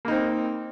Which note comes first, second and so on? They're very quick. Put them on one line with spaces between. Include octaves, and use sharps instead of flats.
A#3 D#4 C4